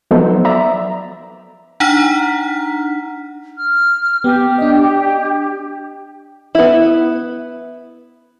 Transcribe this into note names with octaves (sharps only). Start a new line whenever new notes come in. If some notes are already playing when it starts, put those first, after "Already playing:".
F3 F#3 B3 D#4 A4 C5
D5 E5 A#5
D4 D#4 F#5 A#5 F6 B6
F6
B3 G4
D4 D#5
B3 E4